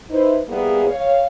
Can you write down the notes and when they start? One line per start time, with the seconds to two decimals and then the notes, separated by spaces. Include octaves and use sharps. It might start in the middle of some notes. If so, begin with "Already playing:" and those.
0.10 D#4 E4 B4 C5
0.49 G3 A#3 B3 E4 G#4
0.87 C#5 F5